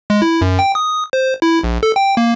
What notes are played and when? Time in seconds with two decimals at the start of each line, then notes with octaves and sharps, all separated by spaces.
0.10 G#3
0.22 E4
0.41 F#2
0.59 G5
0.75 D#6
1.13 C5
1.42 E4
1.64 A#1
1.83 A4
1.96 G5
2.17 A#3